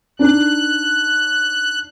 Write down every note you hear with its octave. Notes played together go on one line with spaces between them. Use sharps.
D4 D#4 F#6